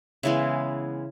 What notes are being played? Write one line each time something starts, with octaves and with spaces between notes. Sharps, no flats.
C#3 E3 G#3 B3 E5